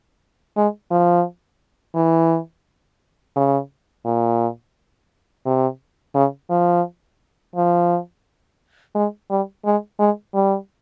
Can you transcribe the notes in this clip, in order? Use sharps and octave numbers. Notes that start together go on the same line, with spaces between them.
G#3
F3
E3
C#3
A#2
C3
C#3
F3
F3
G#3
G3
G#3
G#3
G3